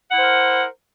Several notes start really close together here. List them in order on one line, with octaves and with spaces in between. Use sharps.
F#5 E4 C5 A#4